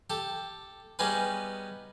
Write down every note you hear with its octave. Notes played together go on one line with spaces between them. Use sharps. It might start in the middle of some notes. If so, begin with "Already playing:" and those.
G4 A4
G3 B3 C#4 D#4 G#4 B4